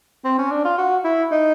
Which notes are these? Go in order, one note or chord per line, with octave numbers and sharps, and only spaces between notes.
C4
C#4
D4
F4
F#4
E4
D#4